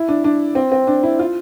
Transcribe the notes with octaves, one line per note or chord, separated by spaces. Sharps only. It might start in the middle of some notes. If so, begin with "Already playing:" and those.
Already playing: E4
D4
D4
C4
C4
D4
E4
F4